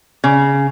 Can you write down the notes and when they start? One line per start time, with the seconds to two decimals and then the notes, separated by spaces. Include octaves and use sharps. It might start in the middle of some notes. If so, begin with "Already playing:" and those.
0.24 C#3